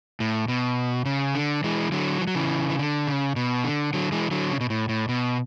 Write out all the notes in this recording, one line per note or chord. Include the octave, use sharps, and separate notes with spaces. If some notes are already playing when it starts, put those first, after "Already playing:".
A2
B2
C#3
D3
E3 G#3
D3 F#3
E3
F#3
C#3 E3
E3
D3
C#3
B2
D3
D3 F#3
E3 G#3
D3 F#3
C#3
B2
A2
A2
B2